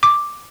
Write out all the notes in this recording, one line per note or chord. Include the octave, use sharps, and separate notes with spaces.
D6